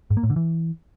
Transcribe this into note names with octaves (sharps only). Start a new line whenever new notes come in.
G#2
A#3
A2
D3
E3